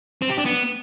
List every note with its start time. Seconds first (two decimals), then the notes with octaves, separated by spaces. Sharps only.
0.22 C4
0.30 G4
0.38 D4
0.46 B3